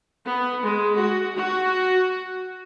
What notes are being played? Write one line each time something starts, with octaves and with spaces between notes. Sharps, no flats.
B3
G#3
F#4
F#4